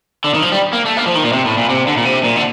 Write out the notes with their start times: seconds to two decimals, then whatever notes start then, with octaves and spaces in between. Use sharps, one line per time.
0.24 D3
0.34 D#3
0.42 F3
0.52 G3
0.73 A#3
0.85 A3
0.97 A#3
1.06 F3
1.15 D#3
1.24 A#2
1.33 C3
1.46 A2
1.58 A#2
1.69 C3
1.87 D3
1.97 A#2
2.05 C3
2.24 A#2
2.36 D3